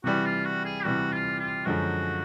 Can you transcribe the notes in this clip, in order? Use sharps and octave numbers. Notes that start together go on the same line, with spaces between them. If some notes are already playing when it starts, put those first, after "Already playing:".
C3 E3 G3 F#4
F4
F#4
G#4
C3 E3 G3 F#4
F4
F4
F#2 D3 F3 G#3 F#4